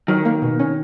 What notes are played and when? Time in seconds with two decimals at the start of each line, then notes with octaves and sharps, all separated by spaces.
0.08 D#3 F#3
0.25 A#3
0.42 B2
0.59 C#4